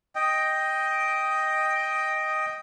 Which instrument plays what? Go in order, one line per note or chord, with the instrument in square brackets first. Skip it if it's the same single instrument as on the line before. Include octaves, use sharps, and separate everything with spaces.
[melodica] D#5 G5